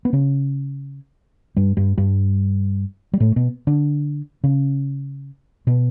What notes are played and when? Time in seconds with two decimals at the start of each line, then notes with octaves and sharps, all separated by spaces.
0.05 B3
0.13 C#3 C#4
1.56 G2 G3
1.77 G2 G3
1.98 G2 G3
3.13 G3
3.20 A2 A3
3.36 B2 B3
3.67 D3 D4
4.44 C#3 C#4
5.67 B2 B3